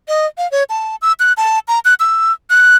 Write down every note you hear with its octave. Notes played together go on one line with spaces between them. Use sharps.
D#5
F5
C#5
A5
E6
F#6
A5
A#5
F#6
E6
F#6